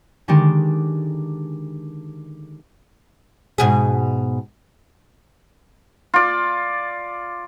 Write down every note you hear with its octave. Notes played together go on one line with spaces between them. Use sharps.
D3 D#3 G#3 D4 G4
G#2 B2 G#4
F4 D5